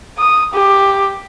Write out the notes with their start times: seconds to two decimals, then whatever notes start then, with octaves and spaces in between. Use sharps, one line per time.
0.18 D#6
0.53 G4